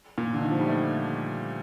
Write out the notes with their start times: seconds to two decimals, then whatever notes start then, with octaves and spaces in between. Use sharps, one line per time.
0.18 A#2
0.34 D3
0.42 D#3
0.51 F3
0.60 G3
0.68 A3